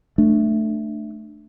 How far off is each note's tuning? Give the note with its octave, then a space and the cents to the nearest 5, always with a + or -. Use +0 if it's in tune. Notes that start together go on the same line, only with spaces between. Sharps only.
A3 +0 D4 +15